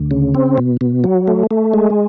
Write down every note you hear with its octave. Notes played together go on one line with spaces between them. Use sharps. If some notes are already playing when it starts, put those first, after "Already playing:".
Already playing: D2
C#3
C4
B2
B2
F#3
A3
A3
G#3